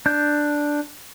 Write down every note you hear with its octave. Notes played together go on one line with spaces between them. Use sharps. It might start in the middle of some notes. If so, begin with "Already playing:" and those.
D4 G6